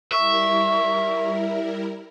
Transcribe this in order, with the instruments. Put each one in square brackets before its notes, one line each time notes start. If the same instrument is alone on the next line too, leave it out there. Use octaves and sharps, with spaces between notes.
[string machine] G3 E4 A#4 [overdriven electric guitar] E5 [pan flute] C#6